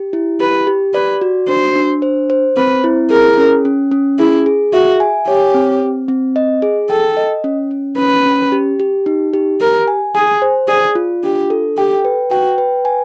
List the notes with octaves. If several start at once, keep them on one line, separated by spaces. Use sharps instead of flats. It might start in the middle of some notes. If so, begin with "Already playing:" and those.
Already playing: G4
E4
G4 B4
G4
B4 D5
F#4
D4 C5
D4
C5
C5
C4 B4
E4
G#4 A#4
C#4
C#4
C#4
E4 G#4
G#4
F#4 E5
G#5
G4 C#5
C4
C4
C4
D#5
G#4
A4 G5
D#5
C#4
C#4
C#4 B4
C#4
G4
G4
D#4
G4
G4 A#4
G#5
G#4 G#5
C5
G#4 D5
F4
D4 G4
A4
G4 G5
B4
F#4 G5
B4
G#5